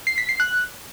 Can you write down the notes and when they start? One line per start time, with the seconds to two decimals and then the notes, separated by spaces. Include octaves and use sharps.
0.07 C7
0.18 B6
0.29 C7
0.40 F#6